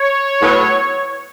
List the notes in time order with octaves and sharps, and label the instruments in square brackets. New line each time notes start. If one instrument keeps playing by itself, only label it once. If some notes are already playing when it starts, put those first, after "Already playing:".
Already playing: [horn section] C#5
A2 F#3 B3